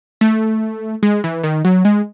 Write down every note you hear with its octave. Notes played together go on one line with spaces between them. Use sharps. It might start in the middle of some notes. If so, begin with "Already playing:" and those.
A3
G#3
E3
D#3
F#3
G#3